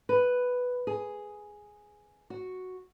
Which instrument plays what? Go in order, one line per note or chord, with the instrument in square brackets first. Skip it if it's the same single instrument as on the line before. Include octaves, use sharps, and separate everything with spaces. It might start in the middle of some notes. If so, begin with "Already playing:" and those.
[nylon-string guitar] B4
G#4
F#4